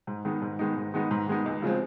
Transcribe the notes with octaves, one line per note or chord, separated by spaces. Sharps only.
G#2
D#3 G#3 B3 D#4
G#2
D#3 G#3 B3 D#4
G#2
D#3 G#3 B3 D#4
G#2
D#3 G#3 B3 D#4
C#2
C#3 F3 G#3 C4